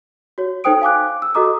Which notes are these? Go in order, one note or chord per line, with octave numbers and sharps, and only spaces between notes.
F#4 C#5
D#4 A4 C5 G5 D#6 D7
F5 G#5 D6 F#6
E6
F#4 A4 D#5 A#5 D6 D#6